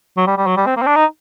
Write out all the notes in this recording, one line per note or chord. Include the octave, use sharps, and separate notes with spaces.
F#3
G3
G3
F#3
G3
C4
A#3
C4
D4
D#4